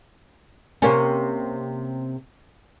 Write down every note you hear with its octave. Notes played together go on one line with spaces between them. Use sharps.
C3 A#3 C#4